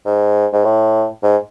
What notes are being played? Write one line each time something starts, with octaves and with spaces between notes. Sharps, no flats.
G#2
G#2
A2
G#2